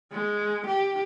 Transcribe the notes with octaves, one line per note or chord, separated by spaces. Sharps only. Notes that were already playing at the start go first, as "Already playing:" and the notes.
G#3
G4